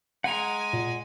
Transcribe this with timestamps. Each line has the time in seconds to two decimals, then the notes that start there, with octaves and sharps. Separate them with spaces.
0.24 G#3 F#5 G#5 A#5
0.73 A#2